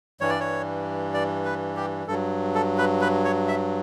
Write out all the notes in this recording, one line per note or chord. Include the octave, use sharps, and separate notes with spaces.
G2 E3 G3 C#5
D5
C#5
D5
B4
G4
G2 F#3 A4
A4
B4
B4
C#5
E5